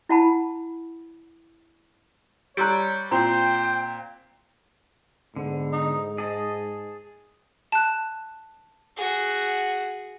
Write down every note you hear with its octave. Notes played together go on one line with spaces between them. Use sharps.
E4 F#5 A5 B5
G3 C#5 A#5 C6 E6 F#6 D7
A#2 C4 C5 G5 A#5
G#2 D3 B3
D#4
G#4 D#5 A5
A5 F#6
F#4 G#4